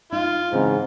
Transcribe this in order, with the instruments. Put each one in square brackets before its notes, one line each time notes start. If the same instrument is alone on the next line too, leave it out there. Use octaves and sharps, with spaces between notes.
[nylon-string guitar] D#4 [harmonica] F4
[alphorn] G#2 [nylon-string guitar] C#3 E3 C4